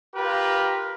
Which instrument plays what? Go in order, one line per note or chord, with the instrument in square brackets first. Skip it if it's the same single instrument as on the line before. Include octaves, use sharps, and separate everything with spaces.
[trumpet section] F4 G4 A#4 B4